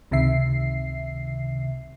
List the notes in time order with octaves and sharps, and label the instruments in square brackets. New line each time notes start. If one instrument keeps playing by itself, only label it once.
[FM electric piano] C#2 C3 D#3 E5 C7